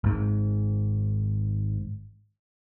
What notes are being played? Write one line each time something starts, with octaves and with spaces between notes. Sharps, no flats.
G#1 G#2